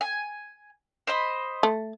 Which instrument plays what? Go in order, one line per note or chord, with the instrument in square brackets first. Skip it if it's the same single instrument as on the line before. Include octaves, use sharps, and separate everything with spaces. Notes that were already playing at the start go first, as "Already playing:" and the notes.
[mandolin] G#5
C5 D#5 B5
[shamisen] A3